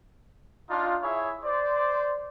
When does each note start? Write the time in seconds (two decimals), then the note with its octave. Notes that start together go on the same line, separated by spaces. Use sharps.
0.70 D4 D#4 F4
1.02 E4 G#4 C#5 E5
1.42 C5 D5